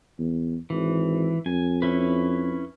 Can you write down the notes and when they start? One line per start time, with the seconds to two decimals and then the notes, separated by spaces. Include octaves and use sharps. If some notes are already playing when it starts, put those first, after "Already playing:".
0.18 E2
0.70 G#1 E3
1.46 F2 G#5
1.82 C#4 E4 B4